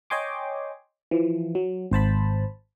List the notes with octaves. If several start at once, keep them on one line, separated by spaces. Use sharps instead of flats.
C#5 D#5 G5 G#5 C6 D6
E3 F3
F#3
G#1 C5 A5 B5